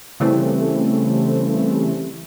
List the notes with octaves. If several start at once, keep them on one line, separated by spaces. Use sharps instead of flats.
C#3 E3 G3 A3 C4